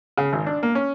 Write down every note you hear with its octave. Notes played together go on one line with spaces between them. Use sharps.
C#3
G#1
D4
A#3
C#4